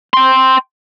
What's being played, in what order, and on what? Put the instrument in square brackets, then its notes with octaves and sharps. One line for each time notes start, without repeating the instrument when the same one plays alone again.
[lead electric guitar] G5 C6